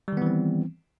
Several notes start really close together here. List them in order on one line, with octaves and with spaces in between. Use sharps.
G3 D#3 B3 E3 C4